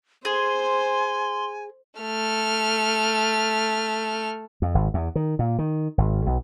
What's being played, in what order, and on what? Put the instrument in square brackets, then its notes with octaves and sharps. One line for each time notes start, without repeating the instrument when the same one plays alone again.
[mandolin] G#4 [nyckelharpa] C5 [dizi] G#5 [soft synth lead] C6
[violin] A3 F6
[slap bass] F2
G#1
E2
D#3
A#2
D#3
G#1
B1